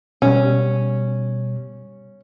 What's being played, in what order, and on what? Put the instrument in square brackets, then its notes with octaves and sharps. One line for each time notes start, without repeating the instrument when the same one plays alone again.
[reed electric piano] B2 G3 [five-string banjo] C#4